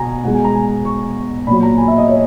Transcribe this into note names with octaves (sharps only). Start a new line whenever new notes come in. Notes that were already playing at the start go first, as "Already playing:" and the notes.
Already playing: B2 G#5 A#5
B2 G#3 F#5
G#5
A#5
G#5
C#6
A#2 F#3 B5
A#5
G#5
E5
D#5
C#5